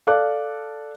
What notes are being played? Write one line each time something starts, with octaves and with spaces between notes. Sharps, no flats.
A4 D5 F5 D6 F#6